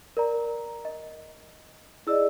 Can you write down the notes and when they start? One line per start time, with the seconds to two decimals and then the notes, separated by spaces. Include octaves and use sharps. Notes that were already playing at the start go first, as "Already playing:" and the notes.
0.17 A#4 D5 A#5
0.85 D#5
2.07 E4 G#4 D5 D#5 E6